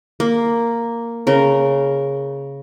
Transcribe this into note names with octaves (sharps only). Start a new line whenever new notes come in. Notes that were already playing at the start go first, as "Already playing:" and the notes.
A#3
C#3 A#4